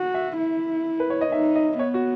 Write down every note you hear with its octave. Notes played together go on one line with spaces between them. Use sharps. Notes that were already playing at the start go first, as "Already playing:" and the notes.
Already playing: F#4
E5
E4
B4
C#5
D#5
D#4 E5
D#5
B3 C#5
F#4